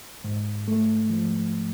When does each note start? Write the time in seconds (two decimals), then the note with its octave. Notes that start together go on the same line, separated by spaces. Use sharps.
0.24 G#2
0.68 A3
1.10 F3